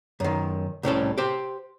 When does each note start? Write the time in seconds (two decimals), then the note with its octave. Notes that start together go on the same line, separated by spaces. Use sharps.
0.20 F#2 D#3
0.83 C2 A2 C#4 A4
1.18 G4 C5